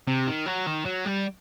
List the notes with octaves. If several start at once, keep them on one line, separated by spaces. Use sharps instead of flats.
C3
D#3
F#3
D#3
F#3
G3